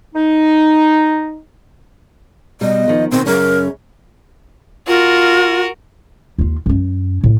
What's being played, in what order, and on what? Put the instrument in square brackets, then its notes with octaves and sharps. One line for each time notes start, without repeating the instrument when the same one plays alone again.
[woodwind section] D#4
[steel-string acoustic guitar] B2 G3 [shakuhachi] D#5
[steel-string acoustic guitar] D#3 F3
[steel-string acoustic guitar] B2 D#3 [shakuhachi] C4
[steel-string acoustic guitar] F#2 C#3 C#4 [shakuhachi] A#4
[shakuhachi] F4 [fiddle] F#4 A#4
[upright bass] D#2 F4
F#2 C#4
A2